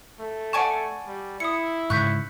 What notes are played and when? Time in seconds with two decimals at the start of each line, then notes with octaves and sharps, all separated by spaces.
0.20 A3
0.53 D5 F#5 G#5 A5 C#6
1.07 G3
1.40 E4 D#6 C#7
1.90 G#2 C#3 C#6 F#6 G6 B6